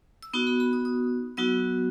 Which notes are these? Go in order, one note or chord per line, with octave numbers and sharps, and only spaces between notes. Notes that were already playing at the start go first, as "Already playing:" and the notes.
E6
B3 D#4 F#4 D#6
B5
B5
D#6
D#6
F#3 B3 D#4 F#4 E6